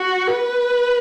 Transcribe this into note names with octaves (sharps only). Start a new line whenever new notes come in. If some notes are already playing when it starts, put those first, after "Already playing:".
Already playing: F#4
B4